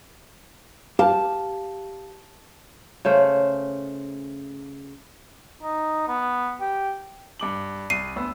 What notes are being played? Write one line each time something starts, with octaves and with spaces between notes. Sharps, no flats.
G4 F5 A5
C#3 A3 C5
D#4
B3
G4
G2 D6 F#7
C2 C7 D#7
D2 B3 E6